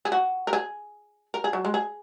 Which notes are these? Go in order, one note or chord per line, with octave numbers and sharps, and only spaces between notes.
G#4
F#4
A#4
G#4
A#4
G#4
F#3
G#3
G#4